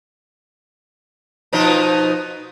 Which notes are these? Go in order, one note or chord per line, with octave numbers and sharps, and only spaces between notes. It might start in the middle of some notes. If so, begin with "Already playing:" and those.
B2 F3 D#4